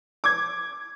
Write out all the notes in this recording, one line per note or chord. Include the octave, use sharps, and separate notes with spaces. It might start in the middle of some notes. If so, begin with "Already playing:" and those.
D6 G#6